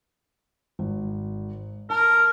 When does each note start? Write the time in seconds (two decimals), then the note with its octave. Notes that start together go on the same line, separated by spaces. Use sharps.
0.79 G#1
1.90 A#4 A5